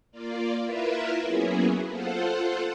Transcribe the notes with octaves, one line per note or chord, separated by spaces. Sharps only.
A#3 F4 D5
E4 F4 A#4 B4 E5
F#3 A#3 B3 C#4 E4 G#4
F4 A4 C5 F#5